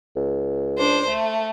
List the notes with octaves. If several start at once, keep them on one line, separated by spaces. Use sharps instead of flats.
C#2
D4 C5
A3